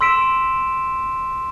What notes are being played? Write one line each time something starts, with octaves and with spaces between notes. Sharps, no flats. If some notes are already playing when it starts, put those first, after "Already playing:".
C6 E6 B6 D7 E7